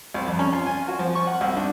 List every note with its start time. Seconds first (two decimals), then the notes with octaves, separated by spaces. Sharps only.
0.14 C2
0.27 F2
0.39 C#4
0.53 F4
0.67 G#5
0.88 F#4
0.99 F3
1.15 C#6
1.27 F#5
1.41 C2
1.56 D4